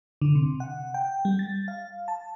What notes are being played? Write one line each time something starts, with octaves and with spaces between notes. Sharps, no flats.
D3
C3
F#5
G5
G3
A6
F5
A5